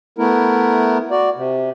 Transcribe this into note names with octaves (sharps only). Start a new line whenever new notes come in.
A3 B3 E4 A#4
F#4 D5
C3